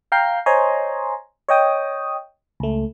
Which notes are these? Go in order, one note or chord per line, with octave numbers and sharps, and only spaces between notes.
F5 G5 A#5 G6 C7
C5 C#5 D#5 G#5 A#5 C6
C#5 D#5 G5 D#6
C#2 A3